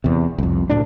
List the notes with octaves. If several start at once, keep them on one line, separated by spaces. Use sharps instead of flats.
E2 C3
C2 F2
D2 A2 F#3 D4